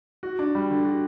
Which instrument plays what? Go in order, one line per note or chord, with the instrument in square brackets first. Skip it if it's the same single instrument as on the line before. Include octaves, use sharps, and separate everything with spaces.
[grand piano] F#4
D4
G3
D3
F#4